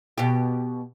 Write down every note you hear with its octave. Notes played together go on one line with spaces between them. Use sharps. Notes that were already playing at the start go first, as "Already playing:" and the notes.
B2 G4